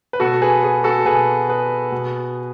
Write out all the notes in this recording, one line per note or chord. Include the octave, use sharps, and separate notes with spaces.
B4
B2 F#4 A4
G#4 B4
G#4 B4
F#4 A4
B2 G#4 B4
G#4 B4
B2